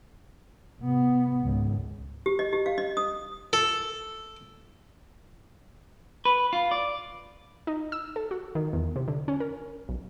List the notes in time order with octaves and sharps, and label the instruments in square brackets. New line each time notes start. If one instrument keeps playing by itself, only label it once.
[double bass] C3 B3
G#1 C#2
[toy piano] G4
D#5
G4
F5
D#5
D#6
[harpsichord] A4
[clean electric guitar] B4
F4
D5
[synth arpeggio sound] D#4
E6
A4
F#4
D#3
E2
C3
D3
C#4
A#4
B1